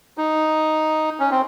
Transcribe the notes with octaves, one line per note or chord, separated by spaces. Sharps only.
D#4
C#4
C4